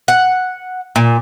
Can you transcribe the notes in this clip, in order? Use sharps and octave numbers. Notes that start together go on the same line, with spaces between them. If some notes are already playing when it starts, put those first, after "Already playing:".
F#5
A#2